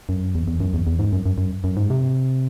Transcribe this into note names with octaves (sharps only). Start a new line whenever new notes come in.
F#2
E2
E2
F#2
E2
E2
G#2
F#2
F#2
F#2
F#2
G#2
C3